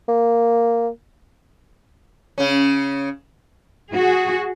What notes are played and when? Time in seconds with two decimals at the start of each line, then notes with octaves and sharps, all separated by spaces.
0.08 A#3
2.38 C#3 C#4
3.92 F#4 G#4